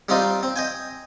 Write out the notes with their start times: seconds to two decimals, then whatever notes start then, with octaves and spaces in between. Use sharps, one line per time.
0.09 G3 C4 D#4 F4 D#5
0.43 C4
0.56 D#5 G5 G#5